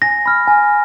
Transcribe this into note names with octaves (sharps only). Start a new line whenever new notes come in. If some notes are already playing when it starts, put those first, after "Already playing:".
G#5 A#6
B5 F6
G#5